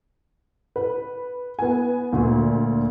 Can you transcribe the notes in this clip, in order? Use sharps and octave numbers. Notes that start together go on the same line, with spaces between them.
B4
B3 G#5
D2 A#2